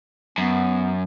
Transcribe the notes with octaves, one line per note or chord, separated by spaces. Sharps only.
F#2 B3